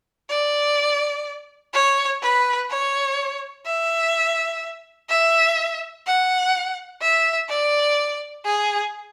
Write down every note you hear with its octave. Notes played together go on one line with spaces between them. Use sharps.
D5
C#5
B4
C#5
E5
E5
F#5
E5
D5
G#4